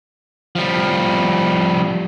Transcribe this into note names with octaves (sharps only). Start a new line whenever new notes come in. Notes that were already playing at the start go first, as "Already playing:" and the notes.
F3 G3